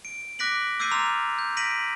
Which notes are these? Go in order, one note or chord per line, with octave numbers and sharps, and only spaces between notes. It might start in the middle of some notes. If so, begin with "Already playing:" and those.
D7
D6 F#6 A#6 B6 D7 F#7
D6 E6 G6 A6 C7 D#7
A#5 C6 F6 F7
G6
A#6 B6 D7 D#7 F#7